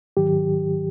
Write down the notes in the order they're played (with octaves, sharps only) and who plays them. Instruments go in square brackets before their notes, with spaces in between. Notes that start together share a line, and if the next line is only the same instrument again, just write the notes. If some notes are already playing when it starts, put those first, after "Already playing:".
[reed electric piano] G#2 D#3 F#3 G4